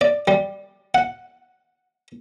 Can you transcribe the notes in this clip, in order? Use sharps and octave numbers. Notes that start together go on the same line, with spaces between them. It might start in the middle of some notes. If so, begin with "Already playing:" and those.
D5
G3
F#5